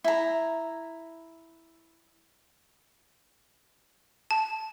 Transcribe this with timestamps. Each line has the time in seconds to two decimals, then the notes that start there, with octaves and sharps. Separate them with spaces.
0.04 E4 A#5
4.31 A5